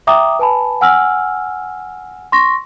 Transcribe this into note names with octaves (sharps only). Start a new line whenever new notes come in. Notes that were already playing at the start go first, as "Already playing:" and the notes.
E5 G5 A#5 D6 D#6
B4 G#5 A5 B5
F#5 G#5 E6 F6
C6 C#6 A#6